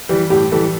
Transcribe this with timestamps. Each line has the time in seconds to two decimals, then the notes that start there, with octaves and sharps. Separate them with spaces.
0.09 E3 G3
0.30 A2 G4
0.52 E3 G3 A4